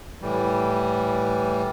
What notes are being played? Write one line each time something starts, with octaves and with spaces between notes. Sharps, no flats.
A2 E3 G3